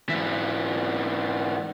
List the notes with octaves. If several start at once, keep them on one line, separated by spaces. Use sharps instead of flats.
G#2 E3